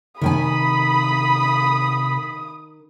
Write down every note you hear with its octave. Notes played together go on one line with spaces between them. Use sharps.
C3 D#3 G5 G#5 B5 D#6